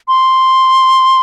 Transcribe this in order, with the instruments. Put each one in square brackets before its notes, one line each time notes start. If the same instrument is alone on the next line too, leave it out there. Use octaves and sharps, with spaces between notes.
[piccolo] C6